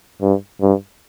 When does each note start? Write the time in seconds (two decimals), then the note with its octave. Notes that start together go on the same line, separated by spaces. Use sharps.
0.22 G2
0.61 G2